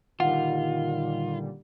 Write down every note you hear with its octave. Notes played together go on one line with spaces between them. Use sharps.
A#2 D3 D#3 G3 F4 F#5